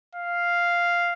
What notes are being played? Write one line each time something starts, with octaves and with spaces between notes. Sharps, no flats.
F5